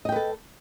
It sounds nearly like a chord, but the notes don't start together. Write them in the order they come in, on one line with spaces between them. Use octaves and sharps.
D#5 G5 B4 A4